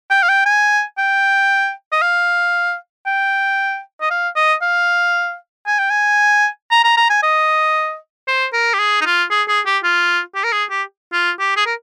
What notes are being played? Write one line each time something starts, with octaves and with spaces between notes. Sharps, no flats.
G5
F5
G5
G#5
G5
D#5
F5
G5
D#5
F5
D#5
F5
G#5
G5
G#5
A#5
A#5
A#5
G#5
D#5
C5
A#4
G4
G#4
D#4
F4
G#4
G#4
G4
F4
G4
A#4
G#4
G4
F4
G4
G#4
A#4